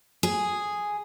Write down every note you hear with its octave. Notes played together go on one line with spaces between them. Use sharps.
G#4